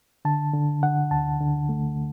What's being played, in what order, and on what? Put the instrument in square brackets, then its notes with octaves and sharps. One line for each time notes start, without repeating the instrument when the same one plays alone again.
[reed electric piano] D3 A5
D3
D3 F#5
D2 A5
D3
A3